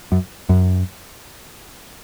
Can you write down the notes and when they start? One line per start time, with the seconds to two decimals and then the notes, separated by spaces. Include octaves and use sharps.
0.12 F#2
0.49 F#2